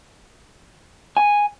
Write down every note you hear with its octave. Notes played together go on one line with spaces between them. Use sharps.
G#5